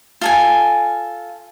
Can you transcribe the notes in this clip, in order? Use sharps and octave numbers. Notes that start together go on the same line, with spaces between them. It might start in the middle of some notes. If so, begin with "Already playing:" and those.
F4 A4 G#5